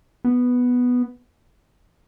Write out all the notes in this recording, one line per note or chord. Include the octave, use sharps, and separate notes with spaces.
B3